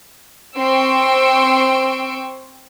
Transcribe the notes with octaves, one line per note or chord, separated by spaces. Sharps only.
C4 G5 C6 C#6 E6 D7